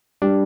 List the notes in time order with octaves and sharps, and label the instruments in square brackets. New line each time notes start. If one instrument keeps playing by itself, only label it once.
[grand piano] G3 [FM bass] D4